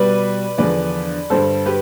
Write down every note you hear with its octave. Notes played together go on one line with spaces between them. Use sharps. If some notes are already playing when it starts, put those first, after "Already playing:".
Already playing: B2 G3 B4 D5
E2 D3 F3 B4 D5
G2 D3 G3 A4 C5
G4 B4